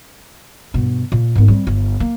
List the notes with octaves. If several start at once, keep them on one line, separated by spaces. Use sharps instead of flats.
G2 B2
A#2
G#2 B3
G3 C4
G1
A#3